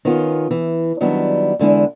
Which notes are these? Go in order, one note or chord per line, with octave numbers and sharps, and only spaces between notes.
D#3 B3 C#4 F4
E3
D#3 F#3 G3 B3 D4 E4
E2 D3 G#3 E4